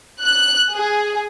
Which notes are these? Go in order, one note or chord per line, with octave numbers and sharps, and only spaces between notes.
F#6
G#4